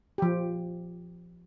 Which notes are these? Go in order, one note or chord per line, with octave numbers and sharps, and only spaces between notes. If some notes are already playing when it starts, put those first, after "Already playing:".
F3 G4